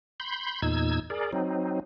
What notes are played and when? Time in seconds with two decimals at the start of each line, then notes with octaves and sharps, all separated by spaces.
0.20 B5 C6 G6
0.62 E2 A#2 D#4 E6 G#6
1.10 G#4 A#4 D5
1.33 F#3 C4 D#4